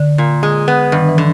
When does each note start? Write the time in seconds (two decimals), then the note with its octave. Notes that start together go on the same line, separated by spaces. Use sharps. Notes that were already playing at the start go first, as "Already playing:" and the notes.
Already playing: D3
0.18 A#2
0.43 G#3
0.68 B3
0.92 G2 D#3
1.09 E3
1.18 D3